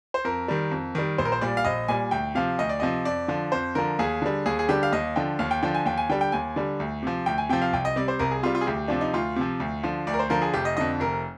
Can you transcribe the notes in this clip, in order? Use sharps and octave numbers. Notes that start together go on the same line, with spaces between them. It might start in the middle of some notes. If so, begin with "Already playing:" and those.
C5
F2 A#4
D#3 G3
F2
D#3 G3
A#1 C5
A#4
C5
A#2 G3 D5
F5
A#1 D#5
A#2 G3 G#5
D2 G5
C3 F3 F5
D2 D#5
D5
C3 F3 D#5
F2 D5
D3 F3
F2 C5
D3 F3 A#4
D#2 G#4
D3 G3
D#2 G#4
G#4
D3 G3 G4
F5
D#2 D#5
D3 F3 G5
D#2 F5
G5
D3 F3 G5
G#5
D#2 G5
G#5
D3 G3 G5
G5
D#2 G#5
D3 G3
D2
C3 F3
D2 G5
G#5
C3 F3 G5
F5
C2 G5
D#5
C3 G3 D5
C5
C2 A#4
G#4
C3 G3 F4
F4
G#4
D2 G4
C3 F3 D4
D#4
D2 F4
C3 F3
D2
D3 F3
D2 D5
A#4
C5
D3 F3 A#4
G#4
F1 G4
D#5
F2 D3 D#5
F1 A#4